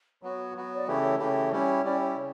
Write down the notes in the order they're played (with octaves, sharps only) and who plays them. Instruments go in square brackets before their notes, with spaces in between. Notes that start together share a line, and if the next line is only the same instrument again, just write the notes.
[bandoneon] F#3 B3 F#4 [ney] C#5
[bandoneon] F#3 B3 F#4
[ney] D5
[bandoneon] C#3 E3 A3 E4 G4 [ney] C#5
[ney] C#5
[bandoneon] C#3 E3 A3 E4 G4 [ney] C#5
[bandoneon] G3 C#4 E4 G4
[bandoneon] G3 C#4 E4 G4 [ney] D5
[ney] C#5
[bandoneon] C#3